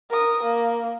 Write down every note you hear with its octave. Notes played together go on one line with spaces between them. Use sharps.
A#4 D#6
A#3